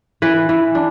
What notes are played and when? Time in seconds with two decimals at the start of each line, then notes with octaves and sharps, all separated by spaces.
0.22 E3 B4
0.49 E3
0.75 D4